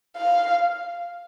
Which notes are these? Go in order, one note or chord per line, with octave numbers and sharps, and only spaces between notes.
F5